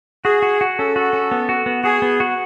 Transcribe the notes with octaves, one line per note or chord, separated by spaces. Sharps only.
F#4 G#4
F#4
F#4
C#4 A4
F#4
C#4
B3
F#4
B3
F#4 G#4
B3
F#4